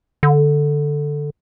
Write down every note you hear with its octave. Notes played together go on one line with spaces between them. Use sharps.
D3